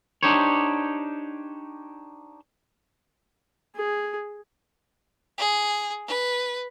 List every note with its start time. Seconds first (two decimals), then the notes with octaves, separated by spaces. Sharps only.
0.23 D4 D#4 G4 C5 C#5
3.76 G#4
5.38 G#4
6.07 B4